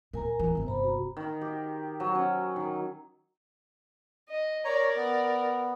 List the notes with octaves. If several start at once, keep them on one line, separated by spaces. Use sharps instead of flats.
A#2 A#4 G#5 A#5
E3
G1 C3
C5 A#5 B5
F#4
D#3
G4
F#3
C#4
D#3
D#5
A#4 C#5 D5 A#5
B3